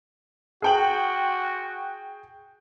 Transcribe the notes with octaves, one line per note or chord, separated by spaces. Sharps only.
F#4 G#4 G5 F#7